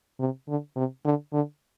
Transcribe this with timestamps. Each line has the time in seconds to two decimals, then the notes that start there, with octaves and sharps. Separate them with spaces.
0.20 C3
0.48 D3
0.76 C3
1.05 D3
1.33 D3